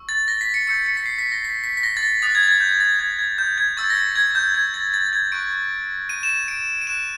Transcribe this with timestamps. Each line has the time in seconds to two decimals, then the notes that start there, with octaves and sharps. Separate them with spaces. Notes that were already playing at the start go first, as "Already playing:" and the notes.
Already playing: C#6 E6
0.09 A6
0.28 A#6
0.41 B6
0.54 C#7
0.67 C#6 E6 G6 C#7
0.86 C#7
0.97 B6
1.06 C7
1.18 B6
1.32 A#6
1.44 B6
1.64 B6
1.77 B6
1.83 A#6
1.97 A6
2.03 A#6
2.22 D#6 F#6 A6
2.35 G#6
2.43 A6
2.48 G#6
2.60 G6
2.80 A6
2.99 G#6
3.19 G#6
3.38 G6
3.58 G#6
3.77 C#6 E6 G6 A6
3.90 A#6
4.16 G#6
4.35 G6
4.54 G#6
4.74 A6
4.94 A6
5.06 A6
5.13 G#6
5.32 C#6 F#6 D7
6.09 D#7
6.23 E7
6.29 D#7
6.48 D7
6.81 D#7
6.87 C#6 F#6 E7